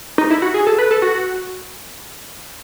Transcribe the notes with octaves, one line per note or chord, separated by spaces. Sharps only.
D#4
E4
F#4
G#4
A4
B4
A4
F#4